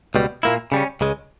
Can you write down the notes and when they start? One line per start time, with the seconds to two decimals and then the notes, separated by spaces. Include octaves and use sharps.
0.15 C#2 B2 G3
0.43 A#2 A#3 E4
0.72 C#3 G3 C#4
1.01 C#2 C#3 G#3